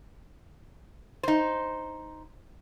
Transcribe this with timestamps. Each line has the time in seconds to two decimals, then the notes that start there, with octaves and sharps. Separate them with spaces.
1.23 D#4 C5